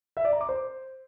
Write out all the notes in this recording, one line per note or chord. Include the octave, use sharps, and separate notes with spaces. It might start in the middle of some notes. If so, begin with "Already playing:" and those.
E5
D5
A#5
D6
C5